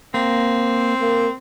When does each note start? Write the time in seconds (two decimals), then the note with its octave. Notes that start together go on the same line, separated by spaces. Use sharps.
0.14 A#3 C4
1.01 A#3